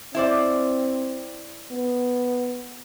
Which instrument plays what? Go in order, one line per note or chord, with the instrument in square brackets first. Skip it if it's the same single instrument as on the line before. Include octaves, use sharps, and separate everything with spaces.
[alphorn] C4 [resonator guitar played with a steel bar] E4 C5 D5
[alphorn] B3